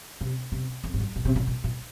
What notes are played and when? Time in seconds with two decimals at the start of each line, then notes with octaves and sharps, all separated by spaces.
0.21 C3
0.52 C3
0.84 F2
0.94 G#2
1.00 F#2
1.16 A#2
1.25 C3
1.36 A#2
1.47 A#2
1.64 A#2